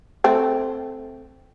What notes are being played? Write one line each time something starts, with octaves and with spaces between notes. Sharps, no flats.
A3 C4